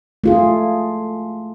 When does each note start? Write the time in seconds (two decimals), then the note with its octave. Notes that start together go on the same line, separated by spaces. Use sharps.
0.24 A3 F4 G#4